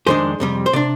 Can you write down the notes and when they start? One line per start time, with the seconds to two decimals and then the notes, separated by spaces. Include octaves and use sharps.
0.07 F2 D#3 G#3 D4 G#4 C5
0.40 F2 C3 G3
0.66 C5
0.73 C3 D4 D5